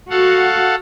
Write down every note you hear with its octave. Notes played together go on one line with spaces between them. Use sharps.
F#4 A4 F5 F#5